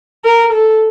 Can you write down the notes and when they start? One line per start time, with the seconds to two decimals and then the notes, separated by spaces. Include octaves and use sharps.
0.24 A#4
0.52 A4